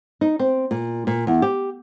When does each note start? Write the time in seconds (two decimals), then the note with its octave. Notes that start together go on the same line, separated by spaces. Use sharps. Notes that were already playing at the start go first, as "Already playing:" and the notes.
0.21 D#4
0.39 C4
0.71 A#2
1.07 A#2
1.27 E2
1.42 G4